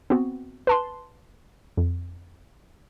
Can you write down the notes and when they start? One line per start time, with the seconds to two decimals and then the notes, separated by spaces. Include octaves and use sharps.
0.10 B3 C4 F#4
0.67 B4 A5 C6
1.77 F2